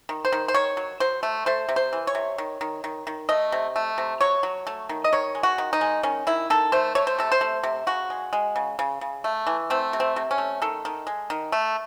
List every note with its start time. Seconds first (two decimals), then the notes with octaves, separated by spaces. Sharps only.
0.09 D#3
0.25 C5
0.32 D#3
0.48 C5
0.54 D#3 C#5
0.77 F#3
1.00 F#3 C5
1.23 A3
1.46 A3 C5
1.69 C3
1.76 C5
1.93 E3
2.07 C#5
2.15 C3
2.38 D#3
2.61 D#3
2.84 D#3
3.07 D#3
3.29 A3 D#5
3.52 C3
3.76 A3
3.98 C3
4.21 F#3 C#5
4.43 F#3
4.67 A3
4.89 D#3
5.04 D#5
5.13 D#3 C#5
5.35 G#3
5.43 F#4
5.58 D#3
5.73 D#4
5.81 G#3
6.03 D#3 C#4
6.27 D#3 E4
6.50 D#3 A4
6.72 A3 C5
6.95 A3 C#5
7.07 C5
7.19 C3 A4
7.32 C5
7.41 A3
7.63 C3
7.87 C#3 F#4
8.10 G#3
8.33 G#3
8.56 C#3
8.79 C#3
9.01 C#3
9.24 A3
9.47 E3
9.70 A3 C4
9.93 C3
10.00 C4
10.16 C3
10.31 C#4
10.38 A3
10.62 D#3 A4
10.85 D#3
11.07 G#3
11.30 D#3
11.52 A3